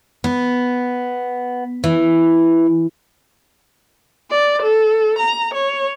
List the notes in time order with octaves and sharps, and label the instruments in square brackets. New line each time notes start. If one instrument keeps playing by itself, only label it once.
[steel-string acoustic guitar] B3
E3
[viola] D5
A4
A#5
C#5